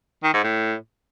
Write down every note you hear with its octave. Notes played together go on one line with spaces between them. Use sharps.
D#3
G#2
A2